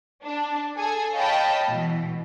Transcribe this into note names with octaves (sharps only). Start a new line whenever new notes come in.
D4
G#4 A4 G#5
C#5 D#5 F5 G5 A5 B5
B2 E3